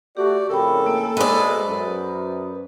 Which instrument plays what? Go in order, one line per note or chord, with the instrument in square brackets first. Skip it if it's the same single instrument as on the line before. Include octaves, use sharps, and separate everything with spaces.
[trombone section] A3 F#4 [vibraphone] G4 [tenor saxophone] D5
[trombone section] F2 A2 C#3 [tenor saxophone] A4 [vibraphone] A#4 G5 B5
[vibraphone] A#3 G#5
[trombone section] B1 G#3 [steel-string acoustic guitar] B4 D5 [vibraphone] C5 D#6
[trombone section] F#2